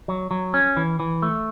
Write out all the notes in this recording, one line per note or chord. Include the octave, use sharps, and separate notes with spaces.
F#3
F#3
C#4
E3
E3
A3